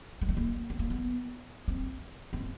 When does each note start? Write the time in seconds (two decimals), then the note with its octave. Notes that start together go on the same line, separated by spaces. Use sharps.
0.21 G#3
0.29 A3
0.37 A#3
0.70 B3
0.79 A#3
0.90 B3
1.68 C4
2.33 C4